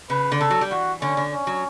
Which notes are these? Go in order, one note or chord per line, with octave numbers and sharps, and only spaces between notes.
C#3 B4
D3
C#3 A4
F#3
G3
E3 F#4
D3 C#4
D3
C#4
F#3